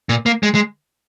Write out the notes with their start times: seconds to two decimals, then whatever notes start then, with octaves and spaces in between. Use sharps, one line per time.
0.09 A#2
0.26 A#3
0.43 G#3
0.55 G#3